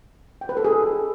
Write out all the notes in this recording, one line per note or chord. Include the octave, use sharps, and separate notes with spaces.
G5
B4
A4
G#4